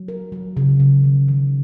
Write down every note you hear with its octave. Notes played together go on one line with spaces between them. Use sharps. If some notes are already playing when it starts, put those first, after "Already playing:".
Already playing: F#3
A#4
F#3
C#3
C#3
D#3
D#3